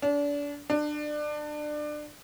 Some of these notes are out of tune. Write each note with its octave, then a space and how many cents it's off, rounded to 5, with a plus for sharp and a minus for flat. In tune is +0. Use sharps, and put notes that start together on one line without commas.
D4 -30
D4 +25